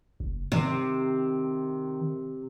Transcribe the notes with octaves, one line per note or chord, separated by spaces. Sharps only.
F#1
C3 D#3